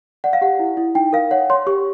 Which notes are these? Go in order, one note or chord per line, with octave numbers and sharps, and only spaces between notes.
D5 F#5
F5
G4 F#5
E4
E4
D#4 G5
A#4 F5
C#5 F#5
C#5 C6
G4 C#6